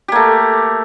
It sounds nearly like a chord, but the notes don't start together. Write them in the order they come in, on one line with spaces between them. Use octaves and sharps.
G4 A#3 A3